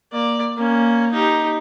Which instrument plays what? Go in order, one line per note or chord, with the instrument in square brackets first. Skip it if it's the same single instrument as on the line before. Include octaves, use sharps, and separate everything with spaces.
[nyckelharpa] A#3 D5
A#3 C#4
D#4 G4